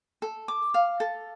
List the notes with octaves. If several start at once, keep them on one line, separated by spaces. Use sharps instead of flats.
A4
D6
F5
A4